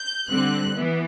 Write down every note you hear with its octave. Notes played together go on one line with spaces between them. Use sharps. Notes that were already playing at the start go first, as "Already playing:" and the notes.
Already playing: G6
D3 G3 C4 F#6
E3 B3